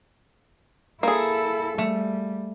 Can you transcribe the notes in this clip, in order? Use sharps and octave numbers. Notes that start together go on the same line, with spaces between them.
A#3 E4 G#4 A4
G3 A3